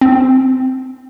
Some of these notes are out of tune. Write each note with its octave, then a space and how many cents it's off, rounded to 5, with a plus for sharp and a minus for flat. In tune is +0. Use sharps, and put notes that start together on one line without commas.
C4 -5